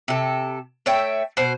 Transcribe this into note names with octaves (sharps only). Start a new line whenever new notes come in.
C3 A4
A3 C#5 E5 G5
B2 C5